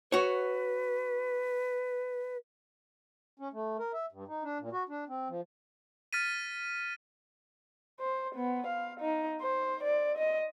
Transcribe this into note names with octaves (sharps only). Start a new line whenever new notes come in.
F#4 B4 C#5
C#4
A3
A#4
E5
G2
D#4
D4
A#2
F#4
D4
C4
F3
F6 A6 B6 D#7
C5
B3
F5
D#4
C5
D5
D#5